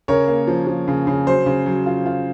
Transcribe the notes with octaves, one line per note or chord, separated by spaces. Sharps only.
C#3 A#4 C#5
A#3
F3
F3
C#3
C#3
F#3 C5
C#3
F#3
F4
F4